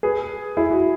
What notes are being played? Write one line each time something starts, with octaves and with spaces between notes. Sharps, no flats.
G#4 B4
E4 G#4
F#4